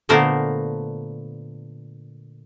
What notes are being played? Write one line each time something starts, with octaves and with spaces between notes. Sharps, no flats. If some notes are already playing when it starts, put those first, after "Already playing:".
A#2 D3 A3 B3 A#4 C5